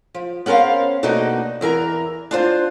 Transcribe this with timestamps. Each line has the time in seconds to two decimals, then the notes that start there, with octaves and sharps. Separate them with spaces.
0.14 F3
0.46 B3 C#4 A#4 C5 F5
1.03 B2 A3 A#3 D4 D#4 F#4
1.61 E2 E3 A#4 A#5
2.31 D4 F4 C5